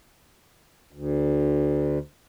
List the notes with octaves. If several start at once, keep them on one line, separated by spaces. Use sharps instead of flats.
D2